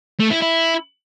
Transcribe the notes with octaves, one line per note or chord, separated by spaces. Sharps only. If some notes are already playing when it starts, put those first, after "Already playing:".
A3
E4
E4